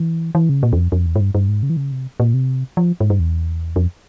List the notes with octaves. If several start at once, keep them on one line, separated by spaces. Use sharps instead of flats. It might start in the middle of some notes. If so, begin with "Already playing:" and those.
Already playing: E3
E3
C#3
A#2
E2
F2
F2
E2
G#2
G2
G2
G#2
C#3
E3
C#3
C3
A#2
C3
F3
G#2
G2
E2
F2